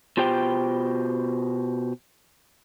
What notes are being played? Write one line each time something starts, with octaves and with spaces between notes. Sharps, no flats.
B2 F4 G4 C5 G5